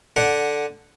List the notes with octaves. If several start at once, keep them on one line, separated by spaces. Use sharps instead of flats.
D3 D4 F#5